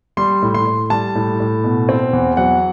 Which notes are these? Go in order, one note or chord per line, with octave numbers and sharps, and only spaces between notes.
G3 C6
A2
C6
A2
G3 A5
A2
A2
B2
C4
E2
F#3 F#5